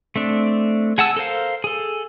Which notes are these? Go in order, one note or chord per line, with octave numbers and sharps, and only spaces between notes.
A3 C4 D4
G#4 F#5 G#5 A5 E6
A4 A#4 C5 F5
G#4 A4